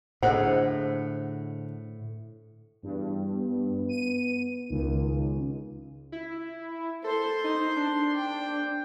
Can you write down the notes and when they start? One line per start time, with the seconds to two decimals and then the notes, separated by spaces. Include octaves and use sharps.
0.23 A2 D3 G#4 C5 D#5 F#5
2.83 E2 G2
3.31 B3
3.89 D#7
4.70 C#2 D#3
6.12 E4
7.04 A4 C5 C6
7.44 D#4
7.76 D4
8.16 G5